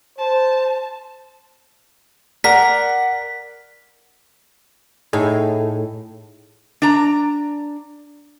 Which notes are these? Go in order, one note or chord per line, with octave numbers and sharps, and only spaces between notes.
C5 A5
A#4 D5 F#5 B6
A2 D#4 G#4
D4 A#5